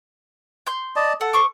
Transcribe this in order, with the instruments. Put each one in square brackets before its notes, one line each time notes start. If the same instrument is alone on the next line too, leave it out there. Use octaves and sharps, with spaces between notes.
[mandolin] C6 G6
[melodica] D5 D#5 A5
[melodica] A4 [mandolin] F#5
[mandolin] C5 C#6 D6